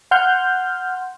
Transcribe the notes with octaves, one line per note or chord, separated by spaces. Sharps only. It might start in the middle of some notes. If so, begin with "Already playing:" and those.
F#5 C6 F6 G6